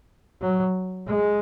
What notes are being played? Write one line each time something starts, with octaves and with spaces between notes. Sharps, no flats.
F#3
G#3